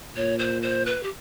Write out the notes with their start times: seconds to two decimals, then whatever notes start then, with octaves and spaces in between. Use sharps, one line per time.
0.16 A#2 C#5
0.39 C5
0.62 C5
0.86 B4
1.03 G4